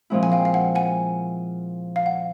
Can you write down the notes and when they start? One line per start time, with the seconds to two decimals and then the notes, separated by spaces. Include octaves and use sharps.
0.10 A#2 F3 G#3 C4 E4
0.23 G#5
0.32 F5 G5
0.45 F5
0.54 F#5
0.75 F#5 G#5
1.96 F5
2.06 F#5